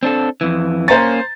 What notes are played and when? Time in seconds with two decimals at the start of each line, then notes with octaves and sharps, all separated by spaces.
0.03 C4 D4 A4
0.41 F2 E3
0.88 A#3 C#4 C5 A#5 A6